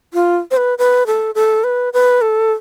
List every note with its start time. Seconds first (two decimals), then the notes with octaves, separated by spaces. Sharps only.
0.14 F4
0.51 C5
0.57 B4
0.78 B4
1.07 A4
1.35 A4
1.64 B4
1.93 B4
2.21 A4